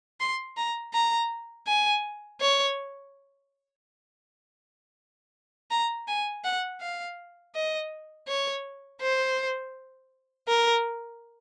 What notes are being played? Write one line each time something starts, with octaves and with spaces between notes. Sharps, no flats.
C6
A#5
A#5
G#5
C#5
A#5
G#5
F#5
F5
D#5
C#5
C5
A#4